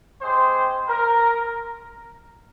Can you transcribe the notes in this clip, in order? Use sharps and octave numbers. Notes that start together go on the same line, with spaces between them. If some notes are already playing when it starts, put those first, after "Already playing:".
G#3 C4 G4 C5
A#4